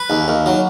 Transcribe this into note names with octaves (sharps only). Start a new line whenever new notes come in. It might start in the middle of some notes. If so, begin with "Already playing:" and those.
Already playing: B4
D#2
D#2
F#3